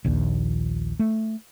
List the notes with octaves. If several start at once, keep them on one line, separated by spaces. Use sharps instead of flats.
A#1 D#2 A#2
A3